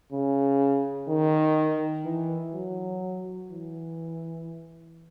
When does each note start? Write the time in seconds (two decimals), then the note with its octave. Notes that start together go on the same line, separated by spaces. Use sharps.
0.12 C#3
1.08 D#3
2.05 E3
2.54 F#3
3.50 E3